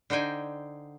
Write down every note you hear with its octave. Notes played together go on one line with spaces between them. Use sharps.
D3 D#4 C5 G5 G#5